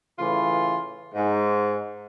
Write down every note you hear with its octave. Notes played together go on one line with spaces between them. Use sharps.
A2 C#3 E3 F4
G#2